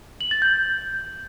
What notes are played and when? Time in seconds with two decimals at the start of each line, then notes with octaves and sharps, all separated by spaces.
0.21 F#7
0.31 A6
0.42 G6